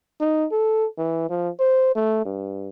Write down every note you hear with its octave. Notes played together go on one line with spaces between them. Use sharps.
D#4
A4
E3
F3
C5
A3
G2